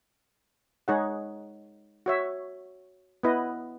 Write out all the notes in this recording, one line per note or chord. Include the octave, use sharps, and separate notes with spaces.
G#3 D#4 G#4 C#5 F#5
F#4 C#5 E5
B3 E4 B4 D#5